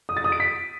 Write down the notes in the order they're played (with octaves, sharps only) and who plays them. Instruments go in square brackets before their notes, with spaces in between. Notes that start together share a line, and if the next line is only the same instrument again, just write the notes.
[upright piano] D#6
A6
D#6
D7
B6